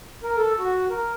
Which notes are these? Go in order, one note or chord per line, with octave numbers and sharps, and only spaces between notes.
A#4
A4
F#4
A#4